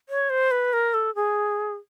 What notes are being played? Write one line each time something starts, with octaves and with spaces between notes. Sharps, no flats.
C#5
C5
B4
A#4
A4
G#4